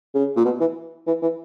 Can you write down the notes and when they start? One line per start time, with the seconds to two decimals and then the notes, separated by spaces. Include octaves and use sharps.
0.15 C#3
0.37 A#2
0.45 B2
0.61 E3
1.07 E3
1.23 E3